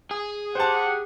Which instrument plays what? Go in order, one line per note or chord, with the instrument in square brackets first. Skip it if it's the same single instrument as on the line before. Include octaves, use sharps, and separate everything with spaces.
[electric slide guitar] G#4 G#5
[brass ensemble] G4 F#5 [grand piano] C5 A5